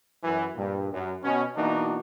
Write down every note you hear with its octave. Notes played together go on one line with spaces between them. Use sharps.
F#2 E3
G2 A#2
F#2
B2 C#4
B2 E3 A#3 D4 D#4 F#4